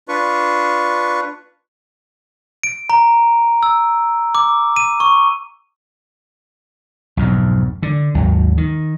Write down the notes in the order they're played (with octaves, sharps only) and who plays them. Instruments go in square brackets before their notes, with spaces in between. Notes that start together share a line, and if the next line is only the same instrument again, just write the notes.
[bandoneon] D4 F4 B4 C#6
[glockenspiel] D7
A#5
E6
D6
D#7
C#6
[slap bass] B1 F2 G#2
D3
G#1 D#2 F#3
D#3